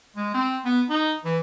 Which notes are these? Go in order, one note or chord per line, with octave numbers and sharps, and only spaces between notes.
G#3
C4
B3
D#4
E3